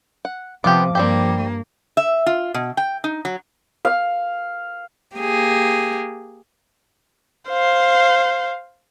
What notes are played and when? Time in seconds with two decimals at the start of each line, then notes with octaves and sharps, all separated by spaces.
0.25 F#5
0.64 C3 F3 B3 G4 D6
0.95 G2 G3 A#3 C4 G4
1.97 E5
2.26 F4
2.54 B2
2.77 G5
3.04 D#4
3.25 F#3
3.85 F5
5.16 A#3 G4 G#4
7.49 C5 F5